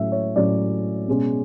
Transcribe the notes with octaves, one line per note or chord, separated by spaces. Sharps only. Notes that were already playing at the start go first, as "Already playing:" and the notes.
Already playing: A2 F#3 C#4 E5
C#5
A2 F#3 C#4 D5
B2 G#3 C#4